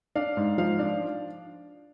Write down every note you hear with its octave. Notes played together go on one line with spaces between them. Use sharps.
D4 F5
G#2
F3 F5
D4